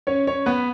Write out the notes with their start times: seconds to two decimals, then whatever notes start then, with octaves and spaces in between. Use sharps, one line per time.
0.07 C#4 C#5
0.27 C#4 C#5
0.46 B3 B4